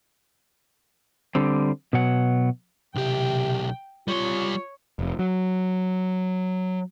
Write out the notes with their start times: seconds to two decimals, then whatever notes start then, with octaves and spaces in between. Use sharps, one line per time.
1.35 D3 G3 C4
1.93 B2 F#3 F#5
2.95 B1 C3 G4 G5
4.08 G3 F4 C#5 C6
4.99 F1
5.19 F#3